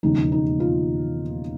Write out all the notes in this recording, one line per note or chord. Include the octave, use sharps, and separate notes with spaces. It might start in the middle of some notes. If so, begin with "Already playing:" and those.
E1 D#2 C#3 F3 G#3 D#4
D#4
F4